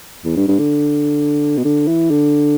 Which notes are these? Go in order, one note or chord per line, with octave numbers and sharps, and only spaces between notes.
E2
G2
G2
D3
B2
D3
E3
D3